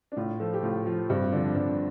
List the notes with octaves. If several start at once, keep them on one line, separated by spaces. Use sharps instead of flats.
D4
A2 F4
F3 A4
G4
A2 F4
F3 F4
G2 C4
D3 F3 D4
G2 D4